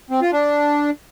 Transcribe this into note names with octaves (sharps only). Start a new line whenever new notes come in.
C4
F4
D4